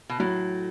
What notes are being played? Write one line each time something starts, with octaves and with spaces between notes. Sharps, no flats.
B2
A2 F#3